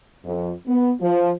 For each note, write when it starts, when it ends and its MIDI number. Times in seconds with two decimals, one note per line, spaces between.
0.25 0.51 41
0.67 0.91 59
1.01 1.31 53